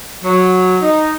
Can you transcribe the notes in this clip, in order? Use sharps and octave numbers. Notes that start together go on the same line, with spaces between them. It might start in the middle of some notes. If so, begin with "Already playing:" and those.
F#3
D#4